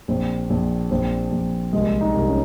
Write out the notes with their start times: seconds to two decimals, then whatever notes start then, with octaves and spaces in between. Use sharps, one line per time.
0.08 A#1 C4
0.50 A#1
0.91 A#1 C4
1.32 A#1
1.73 C2 G#3
2.01 D#4
2.14 C2
2.28 C#4